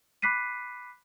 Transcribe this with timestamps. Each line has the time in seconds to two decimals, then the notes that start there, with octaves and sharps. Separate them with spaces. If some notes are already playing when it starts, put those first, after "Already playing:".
0.22 B5 D6 F#6 B6 C7 D#7